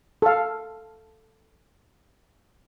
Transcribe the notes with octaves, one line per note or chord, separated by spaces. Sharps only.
A4 F5